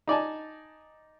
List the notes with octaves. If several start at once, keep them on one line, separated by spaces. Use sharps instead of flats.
D#4 D5 G#5 A5